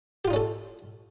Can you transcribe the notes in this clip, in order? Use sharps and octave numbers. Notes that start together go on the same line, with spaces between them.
C#4 D#4 F4 G4 A4